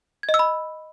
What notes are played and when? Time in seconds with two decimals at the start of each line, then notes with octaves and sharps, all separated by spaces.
0.23 G#6
0.29 D#5
0.34 E6
0.39 B5